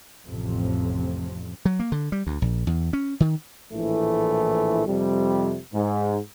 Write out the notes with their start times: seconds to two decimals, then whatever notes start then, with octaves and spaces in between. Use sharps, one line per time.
0.25 A1 F2 C3
1.66 F#3
1.79 A#3
1.92 D3
2.12 G3
2.27 D2
2.42 A#1
2.67 E2
2.93 C#4
3.20 D#3
3.72 A#1 A2 E3 A3
4.87 F2 C3 G3
5.73 G#2